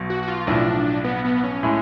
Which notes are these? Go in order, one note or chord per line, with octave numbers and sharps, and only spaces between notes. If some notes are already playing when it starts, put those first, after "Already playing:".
Already playing: B1 B2
F#4
F#4
F4
B1 A2 F3 D4
B3
B3
C#4
A2 G#3